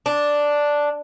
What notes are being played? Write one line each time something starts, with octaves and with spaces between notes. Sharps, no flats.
D4